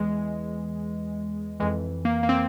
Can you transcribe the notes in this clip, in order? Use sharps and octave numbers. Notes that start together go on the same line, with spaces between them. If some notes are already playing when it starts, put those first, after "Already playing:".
Already playing: E2 E3 G#3
F2 E3 G#3
A#3
A#3
C4